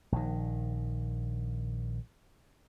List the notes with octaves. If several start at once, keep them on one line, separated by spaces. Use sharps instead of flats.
A#1 D#3